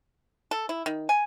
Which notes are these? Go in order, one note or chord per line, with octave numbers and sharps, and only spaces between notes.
A4
E4
D#3
G#5